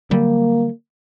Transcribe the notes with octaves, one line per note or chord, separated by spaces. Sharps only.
D3 F#3 G3 A#3